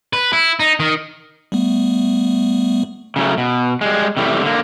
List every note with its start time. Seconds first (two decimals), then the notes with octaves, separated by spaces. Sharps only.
0.13 B4
0.33 E4
0.60 D#4
0.80 D#3
1.52 G3 A3 B3
3.16 C#3 F#3 A3
3.38 B2
3.81 G3 G#3
4.17 C3 E3 G3 A3
4.42 D3 A#3